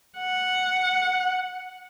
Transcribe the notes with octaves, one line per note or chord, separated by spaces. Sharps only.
F#5